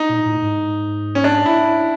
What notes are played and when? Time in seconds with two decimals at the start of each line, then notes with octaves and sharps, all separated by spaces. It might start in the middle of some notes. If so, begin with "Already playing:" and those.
Already playing: D#4
0.09 A#2
0.25 A2
0.42 G#2
1.15 C#4
1.24 D4
1.46 E4